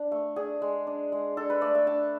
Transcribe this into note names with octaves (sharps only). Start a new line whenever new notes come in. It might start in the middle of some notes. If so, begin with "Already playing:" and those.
Already playing: D4
A3
D4 G#4
G#3
D4
G#3
D4 A4
B4
A3 D5
E5
D4 A5